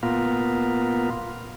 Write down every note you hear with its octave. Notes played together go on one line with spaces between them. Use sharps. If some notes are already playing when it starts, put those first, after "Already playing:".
A#2 A#3 B3 F4